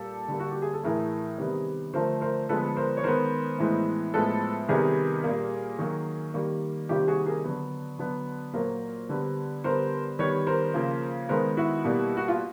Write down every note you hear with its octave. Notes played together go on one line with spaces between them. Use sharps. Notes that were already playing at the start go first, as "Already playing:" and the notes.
Already playing: A#2 G3 A#3 G4 A4
D3 G3 A#3
F#4
G4
G#4
A4
A2 E3 A3 G#4 A#4
C3 D#3 G3 B3
D3 F3 A3 A#4 C5
A#4 C5
D3 F3 G#3 B3 A4 B4
A#4 C5
C#5
D#3 G#3 B3 A#4 C5
A2 E3 G#3 B3
A2 F3 G#3 B3 A4 B4
C3 D#3 G3 B3 G#4 A#4
A#2 G3 A#3
D#3 F#3 A#3
D#3 G3 A#3
C3 D#3 G3 A#3 F4 G4
F#4 G#4
G#4 A#4
D3 F#3 B3
D3 F#3 B3
A#2 F#3 A#3 A#4 C5
D3 G3 B3
D3 G3 B3 A#4 C5
D#3 G3 B3 B4 C#5
A#4 C5
C#3 F3 A#3
D#3 G#3 B3 A#4 C5
E4 F#4
B2 G3 A#3
F#4
F4